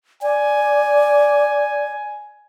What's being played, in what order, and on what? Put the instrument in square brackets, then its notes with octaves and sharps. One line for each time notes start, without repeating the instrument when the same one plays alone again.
[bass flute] D5 [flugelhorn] G#5